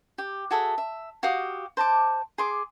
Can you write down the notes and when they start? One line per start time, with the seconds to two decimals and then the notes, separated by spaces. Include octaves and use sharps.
0.18 G4
0.51 F#4 G#4 A4 E5
0.78 E5
1.23 F#4 G4 F5 D#6
1.77 C5 A5 A#5 D6
2.38 G#4 C6 D6